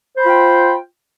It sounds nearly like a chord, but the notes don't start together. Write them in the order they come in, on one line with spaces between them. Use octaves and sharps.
C5 B5 F4 G5